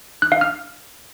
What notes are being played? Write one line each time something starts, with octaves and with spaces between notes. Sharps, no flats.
F#6
F5
F6